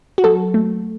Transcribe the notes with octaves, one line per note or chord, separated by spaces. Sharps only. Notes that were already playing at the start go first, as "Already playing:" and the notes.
F#4
F#3 A4
A3